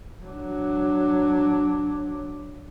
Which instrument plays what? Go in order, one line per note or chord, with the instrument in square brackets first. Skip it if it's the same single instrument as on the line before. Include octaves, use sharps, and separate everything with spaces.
[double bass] F#3 D4